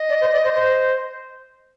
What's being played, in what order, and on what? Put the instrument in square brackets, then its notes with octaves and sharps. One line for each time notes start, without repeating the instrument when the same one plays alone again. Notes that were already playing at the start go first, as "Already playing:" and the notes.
Already playing: [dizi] D#5
[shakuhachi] D5
C5
D5
C5
C5